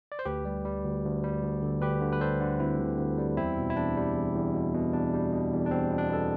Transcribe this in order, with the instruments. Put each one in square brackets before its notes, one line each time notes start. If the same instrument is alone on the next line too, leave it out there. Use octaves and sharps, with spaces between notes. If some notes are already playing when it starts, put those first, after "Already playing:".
[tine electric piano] D5
C5
D2 G4 B4
G3
G3
D2
D2
G3
D2
D3
D2 G4 B4
D3
B4
G3 A4 C5
D3
D2 C4 E4
D2
D2
G3
E2 C4 E4
B2
E4
E2 D4
G3
E2
E2
B2
B2
E2 D4
G3
B2
E2
D4
E2 C4
B2
D4
B2 A4